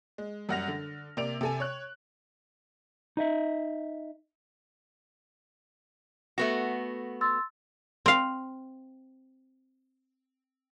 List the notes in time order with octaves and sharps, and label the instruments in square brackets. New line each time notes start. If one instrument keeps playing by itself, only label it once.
[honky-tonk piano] G#3
F#2 G3 F#5 F6 A#6 F7
D3
C3 A#3 D5 D7 F7
C3 A4 G#5
C#5 F#6
[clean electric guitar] D#4 D#5 E5
[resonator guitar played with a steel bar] A3 B3 F#4 [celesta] A#6
[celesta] C6 E6 A6
[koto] C4 F5